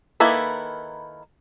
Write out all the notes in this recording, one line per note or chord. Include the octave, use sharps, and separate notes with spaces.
D#3 A#3 E4 A4 B4